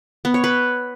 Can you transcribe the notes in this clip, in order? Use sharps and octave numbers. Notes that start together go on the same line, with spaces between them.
B3
C#5
B4